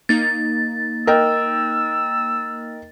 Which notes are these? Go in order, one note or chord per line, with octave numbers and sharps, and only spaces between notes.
A#3 D#4 A6
A#4 D#5 G5 E6